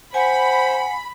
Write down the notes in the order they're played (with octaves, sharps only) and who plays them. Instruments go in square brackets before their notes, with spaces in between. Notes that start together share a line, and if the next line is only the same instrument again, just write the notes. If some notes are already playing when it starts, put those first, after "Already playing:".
[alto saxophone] C5 [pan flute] F#5 [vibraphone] G#5 [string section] B5